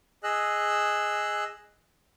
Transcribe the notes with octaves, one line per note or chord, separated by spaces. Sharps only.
G#4 D#5 E6 F#6